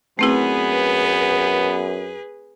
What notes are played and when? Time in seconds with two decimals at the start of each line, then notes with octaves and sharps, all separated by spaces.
0.19 F#2 A3 B3 C4 E4 G#4 B4